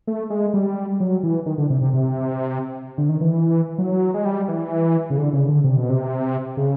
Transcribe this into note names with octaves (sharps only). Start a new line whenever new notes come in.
A3
G#3
G3
F#3
E3
D#3
D3
C3
C3
C3
D3
D#3
E3
F#3
G#3
G3
E3
C#3
D3
C#3
D3
C3
B2
C3
C#3